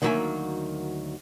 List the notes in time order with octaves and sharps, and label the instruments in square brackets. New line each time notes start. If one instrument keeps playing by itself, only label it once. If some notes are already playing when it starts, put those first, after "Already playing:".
[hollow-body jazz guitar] D2 D#3 F#3 A#3 E5 G#5